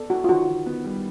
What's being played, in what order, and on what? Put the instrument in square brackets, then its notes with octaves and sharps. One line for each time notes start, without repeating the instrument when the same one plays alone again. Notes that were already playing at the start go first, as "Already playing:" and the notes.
Already playing: [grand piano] B3 A4 D5
[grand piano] E4 [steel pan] F#4
[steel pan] F4
[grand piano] D#3 [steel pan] F#4
[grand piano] D#3
B3
G3